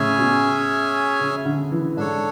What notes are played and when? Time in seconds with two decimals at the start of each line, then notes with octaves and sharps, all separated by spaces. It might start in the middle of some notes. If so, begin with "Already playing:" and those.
Already playing: A2 C#3 C#4 G#4 C#5 E5 G#5
0.18 B2
1.20 C#3
1.45 D3
1.72 E3
1.97 G#2 D4 A4 C#5